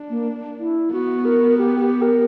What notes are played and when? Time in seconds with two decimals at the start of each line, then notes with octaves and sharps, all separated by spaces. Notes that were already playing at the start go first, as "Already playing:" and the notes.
Already playing: D4
0.10 A#3
0.60 E4
0.92 B3 F#4
1.25 A#4
1.58 G4
1.80 G4
2.02 A#4